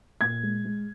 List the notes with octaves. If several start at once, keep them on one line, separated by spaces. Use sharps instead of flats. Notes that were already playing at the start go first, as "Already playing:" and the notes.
A#2 G#6
G#3
G#3